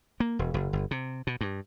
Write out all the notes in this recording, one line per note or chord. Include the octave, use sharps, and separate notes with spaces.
A#3
E1
F#1
G1
C3
B2
G2